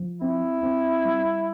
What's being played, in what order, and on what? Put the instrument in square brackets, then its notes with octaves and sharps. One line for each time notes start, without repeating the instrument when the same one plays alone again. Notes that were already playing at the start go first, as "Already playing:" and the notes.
Already playing: [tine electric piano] F3
[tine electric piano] C4 [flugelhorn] E4
[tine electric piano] C4
G3